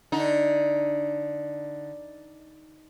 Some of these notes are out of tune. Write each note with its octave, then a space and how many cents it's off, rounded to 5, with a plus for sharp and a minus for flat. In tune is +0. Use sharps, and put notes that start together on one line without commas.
D3 +0 D#4 +10